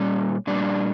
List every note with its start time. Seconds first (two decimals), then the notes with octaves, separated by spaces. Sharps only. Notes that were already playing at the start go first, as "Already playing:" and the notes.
Already playing: A#2 G3 C#4
0.47 A#2 G3 D4